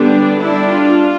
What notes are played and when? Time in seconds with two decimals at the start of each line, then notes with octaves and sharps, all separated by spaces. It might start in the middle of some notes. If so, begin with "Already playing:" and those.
Already playing: D3 G3 B3 D4
0.39 G3 D4 E4
0.69 F4